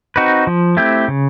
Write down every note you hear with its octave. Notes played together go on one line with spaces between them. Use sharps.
C4 D#4 F#4 B4
F3
A3 C4 E4 G4
C#3